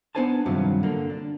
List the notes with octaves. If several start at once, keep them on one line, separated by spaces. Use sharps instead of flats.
B3 D4 D#4 C5 G#5 A5
G2 C3 D#3 F3 F#3
D3 A#3
D4